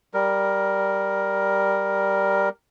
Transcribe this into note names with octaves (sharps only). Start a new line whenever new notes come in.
G3 A#4